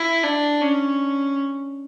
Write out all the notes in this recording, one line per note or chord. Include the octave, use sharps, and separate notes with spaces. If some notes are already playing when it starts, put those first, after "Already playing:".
Already playing: E4
D4
C#4